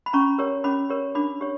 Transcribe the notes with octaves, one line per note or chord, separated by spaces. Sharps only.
B5
C#4 A#5 C#6
G4 A#4 C#5
C#4 B5 D6
G4 A#4 C#5
D4 B5 D6
G4 C#5